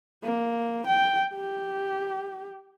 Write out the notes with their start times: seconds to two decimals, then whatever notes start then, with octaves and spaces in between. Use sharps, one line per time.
0.23 A#3
0.87 G5
1.35 G4